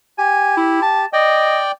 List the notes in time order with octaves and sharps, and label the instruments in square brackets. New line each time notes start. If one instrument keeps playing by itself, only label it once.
[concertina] G4 [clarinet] G#5
[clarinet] E4
A5
[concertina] D5 G5 [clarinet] D#5